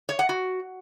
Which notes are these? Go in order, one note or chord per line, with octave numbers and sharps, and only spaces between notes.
C#5
F#5
F#4